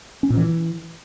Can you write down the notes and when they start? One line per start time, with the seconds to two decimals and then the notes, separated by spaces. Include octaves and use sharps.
0.23 C#4
0.30 A#2
0.37 E3